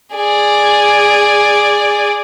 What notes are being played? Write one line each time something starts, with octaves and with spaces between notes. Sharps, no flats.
G#4 D5